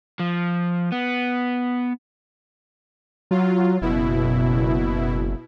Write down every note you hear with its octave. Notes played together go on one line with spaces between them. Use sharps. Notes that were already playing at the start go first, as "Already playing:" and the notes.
F3
B3
F#3 F4
F#1 B2 E4